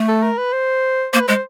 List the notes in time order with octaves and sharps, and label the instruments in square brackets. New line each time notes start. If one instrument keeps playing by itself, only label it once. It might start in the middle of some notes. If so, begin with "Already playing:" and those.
Already playing: [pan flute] A3
[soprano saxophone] A4
A#4
B4
C5
[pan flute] A#3 [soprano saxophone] C5
[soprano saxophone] B4
[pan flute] G#3 [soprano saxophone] C5